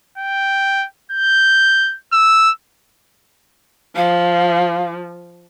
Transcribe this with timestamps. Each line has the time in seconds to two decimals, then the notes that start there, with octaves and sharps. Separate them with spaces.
0.18 G5
1.12 G6
2.13 E6
3.96 F3 F5